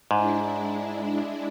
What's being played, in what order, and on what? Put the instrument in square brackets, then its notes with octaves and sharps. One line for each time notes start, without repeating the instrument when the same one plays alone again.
[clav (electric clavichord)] G#2 [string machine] G#3 D4 E4